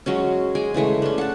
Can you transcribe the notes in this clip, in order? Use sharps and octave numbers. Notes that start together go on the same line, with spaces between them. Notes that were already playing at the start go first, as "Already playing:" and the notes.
F#3 G#3 C#4
G#3 G#5 D6
C#3 E3 G#3 A3
C#4 D4
F#5 A5